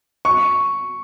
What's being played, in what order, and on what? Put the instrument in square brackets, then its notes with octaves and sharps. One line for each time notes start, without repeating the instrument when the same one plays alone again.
[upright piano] C#6